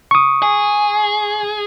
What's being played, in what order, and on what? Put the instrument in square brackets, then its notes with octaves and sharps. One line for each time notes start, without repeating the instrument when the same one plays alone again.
[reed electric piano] C#6 D#6
[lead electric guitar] G#4